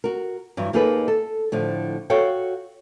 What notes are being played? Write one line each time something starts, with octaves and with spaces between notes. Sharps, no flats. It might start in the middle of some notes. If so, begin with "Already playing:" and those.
F#4 A#4
G2 E3 F#3
D#2 A#3 D#4 G#4 A4 B4
A4
A2 D3 F3
F#4 A4 C#5 F5 G5